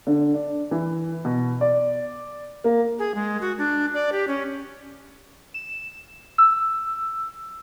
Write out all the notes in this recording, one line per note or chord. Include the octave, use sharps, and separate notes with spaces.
D3
D4
E3
B2
D5
A#3
G#4
G#3
F#4
D4
D5
G4
C#4
E7
E6